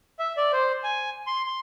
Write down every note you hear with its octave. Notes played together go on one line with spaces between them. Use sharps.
E5
D5
C5
G#5
C6
C6